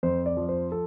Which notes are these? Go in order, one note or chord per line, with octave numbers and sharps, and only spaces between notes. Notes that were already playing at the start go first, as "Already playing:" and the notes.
F2 C5
D5
F3
C5
A4